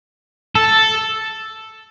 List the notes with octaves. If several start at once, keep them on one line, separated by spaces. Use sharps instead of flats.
A4